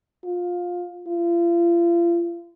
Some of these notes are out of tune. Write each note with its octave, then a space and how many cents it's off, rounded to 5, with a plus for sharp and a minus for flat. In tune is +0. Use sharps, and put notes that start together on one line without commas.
F4 +20
F4 -40